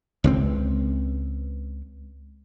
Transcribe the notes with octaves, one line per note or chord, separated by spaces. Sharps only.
C#2 G#3 C4